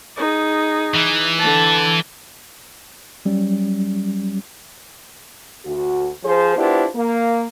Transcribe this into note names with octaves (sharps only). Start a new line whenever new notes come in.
D#4 G#4
E3
D3 A5
F#3 G3 C#4
D2 F#4
F3 G#4 C5
B3 D4 E4 F4 G4 C5
A#3